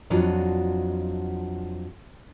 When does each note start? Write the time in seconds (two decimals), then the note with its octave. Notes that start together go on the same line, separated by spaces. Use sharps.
0.10 F2 F#3 D4 F4 F#4 D#5